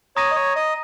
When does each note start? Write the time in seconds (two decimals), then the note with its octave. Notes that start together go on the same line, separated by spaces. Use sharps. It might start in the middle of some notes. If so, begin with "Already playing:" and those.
0.16 C#5 A#5 D#6 A#6 D#7
0.31 D#5
0.36 C#5
0.56 D#5